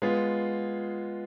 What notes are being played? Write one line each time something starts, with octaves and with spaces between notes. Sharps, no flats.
G#3 B3 F4